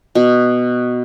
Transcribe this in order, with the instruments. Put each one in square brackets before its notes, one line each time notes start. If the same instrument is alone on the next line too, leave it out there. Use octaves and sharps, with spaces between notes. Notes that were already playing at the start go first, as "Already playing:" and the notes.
[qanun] B2